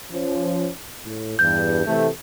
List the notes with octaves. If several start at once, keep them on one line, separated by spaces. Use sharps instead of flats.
F3 C#4
A2
E2 G2 G6
C3 E3 A3